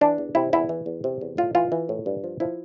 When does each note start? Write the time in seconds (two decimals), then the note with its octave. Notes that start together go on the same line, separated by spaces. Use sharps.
0.01 E3 D4
0.18 E2
0.35 C3 E4
0.53 E2 E4
0.69 E3
0.86 E2
1.04 C3
1.21 E2
1.37 A2 F4
1.55 E3 F4
1.72 E3
1.89 A2
2.06 G2
2.24 F3
2.40 F3 E4